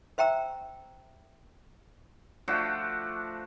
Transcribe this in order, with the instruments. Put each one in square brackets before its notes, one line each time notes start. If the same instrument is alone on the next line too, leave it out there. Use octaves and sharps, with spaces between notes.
[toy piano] C5 E5 G5 A#5 E6
[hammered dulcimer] F3 A3 D4 F#4